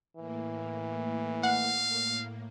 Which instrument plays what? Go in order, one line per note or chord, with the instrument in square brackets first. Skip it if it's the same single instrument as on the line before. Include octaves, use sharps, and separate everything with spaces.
[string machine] A2 A#3 [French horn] E3
[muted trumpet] F5 [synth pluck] F#5